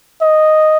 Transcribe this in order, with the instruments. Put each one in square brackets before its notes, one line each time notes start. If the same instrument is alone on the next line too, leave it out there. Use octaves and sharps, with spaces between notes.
[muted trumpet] D#5